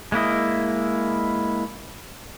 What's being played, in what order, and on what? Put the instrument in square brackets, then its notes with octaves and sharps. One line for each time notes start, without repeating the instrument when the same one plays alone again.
[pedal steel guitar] G#3 A#3 E4 D#5